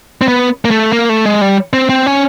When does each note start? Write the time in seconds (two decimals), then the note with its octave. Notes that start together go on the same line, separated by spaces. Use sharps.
0.22 C4
0.28 B3
0.65 A#3
0.71 A3
0.93 A#3
1.09 A3
1.25 G#3
1.41 G3
1.73 C4
1.89 C4
2.06 C#4